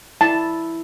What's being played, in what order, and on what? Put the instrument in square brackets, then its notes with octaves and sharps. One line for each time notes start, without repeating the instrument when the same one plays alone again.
[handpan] E4 [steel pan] A5